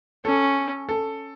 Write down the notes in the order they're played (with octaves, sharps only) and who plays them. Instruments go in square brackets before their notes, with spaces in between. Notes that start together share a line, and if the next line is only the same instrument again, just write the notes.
[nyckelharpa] C#4 [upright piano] A4
[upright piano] A4